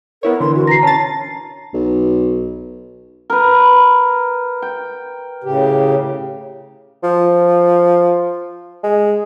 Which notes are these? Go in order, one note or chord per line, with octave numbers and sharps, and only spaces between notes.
B3 E4 A#4 C#5
D3 E3 C6
F#4
A#5 A#6 C7
C#4 A5 A6
B1
A#4 B4
G5
A2 C#3 G4
F3
G#3